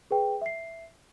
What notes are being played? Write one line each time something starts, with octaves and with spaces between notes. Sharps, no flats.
G#4 B4 G5
E5 C7